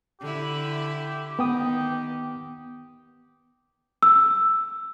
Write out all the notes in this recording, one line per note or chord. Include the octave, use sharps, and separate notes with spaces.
D3 E4 G4
D#3 B3 G5 D#6
E6